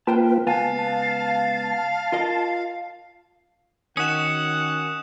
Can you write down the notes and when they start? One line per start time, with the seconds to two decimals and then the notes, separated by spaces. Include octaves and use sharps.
0.07 A#3 F4 B4 C5 G5 A5
0.47 C#2 B3 F5 G#5 A5
2.12 F4 A#4 D#5
3.97 D#3 C#4 F#4 F#5 D#6 F#6 E7